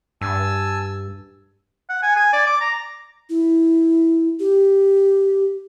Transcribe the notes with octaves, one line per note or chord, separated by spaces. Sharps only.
G2 G#5 A5 E6
F#5
G#5
G#5
D5
D6
A#5
E4
G4